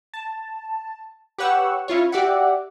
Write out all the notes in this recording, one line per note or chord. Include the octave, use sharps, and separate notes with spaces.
A5
G4 B4 C#5 F#5 C#6 E6
C#4 E4 F4 C#5
F#4 G4 D5 E5 F#5